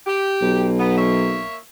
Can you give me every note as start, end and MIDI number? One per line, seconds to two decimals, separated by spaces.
0.06 0.65 67
0.42 1.45 35
0.79 0.96 59
0.98 1.57 58
0.98 1.57 73
0.98 1.57 76